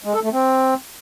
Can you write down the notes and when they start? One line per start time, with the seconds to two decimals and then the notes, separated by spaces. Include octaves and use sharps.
0.04 G#3
0.14 A4
0.23 A3
0.32 C4